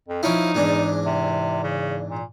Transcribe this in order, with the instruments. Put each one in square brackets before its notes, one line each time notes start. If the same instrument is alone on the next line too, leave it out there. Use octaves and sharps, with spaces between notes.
[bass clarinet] F2
[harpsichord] F3 C#4 E4 [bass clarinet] D#4
[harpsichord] E2 G#2 D4
[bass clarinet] C3
C#3
A#2